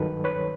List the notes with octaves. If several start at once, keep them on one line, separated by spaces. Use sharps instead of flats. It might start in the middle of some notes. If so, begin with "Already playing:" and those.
Already playing: G2 D#3 F#3 A4 B4
B4 C#5